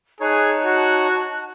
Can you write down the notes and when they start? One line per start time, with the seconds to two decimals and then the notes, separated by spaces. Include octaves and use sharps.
0.20 D#4 G#4 C#5 A5 F#6
0.65 F#4